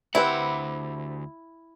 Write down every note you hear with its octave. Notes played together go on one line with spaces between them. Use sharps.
D2 C4 E4 G4 B4 F#5